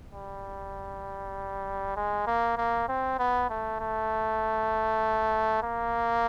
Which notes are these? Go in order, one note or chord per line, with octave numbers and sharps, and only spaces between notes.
G3
G#3
A#3
A#3
C4
B3
A3
A3
A#3